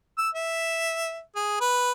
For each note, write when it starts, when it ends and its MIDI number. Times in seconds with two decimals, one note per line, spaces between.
0.18 0.28 88
0.35 1.20 76
1.36 1.58 68
1.60 1.92 71